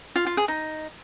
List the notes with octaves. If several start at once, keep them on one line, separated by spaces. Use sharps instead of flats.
F4
F4
G#4
D#4